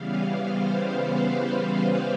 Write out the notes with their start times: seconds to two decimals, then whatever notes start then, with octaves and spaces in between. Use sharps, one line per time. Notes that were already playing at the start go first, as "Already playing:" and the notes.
Already playing: C#3 E3 G3 B3 F5
0.40 C5
0.93 B4